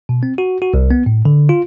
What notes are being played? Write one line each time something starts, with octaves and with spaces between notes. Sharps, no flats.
B2
C4
F#4
F#4
C2
B3
A2
D3
F4